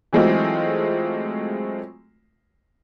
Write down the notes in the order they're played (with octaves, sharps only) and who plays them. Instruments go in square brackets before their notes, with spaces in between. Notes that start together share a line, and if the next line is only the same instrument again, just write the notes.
[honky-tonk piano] E3 F#3 G#3 A3 C4 F4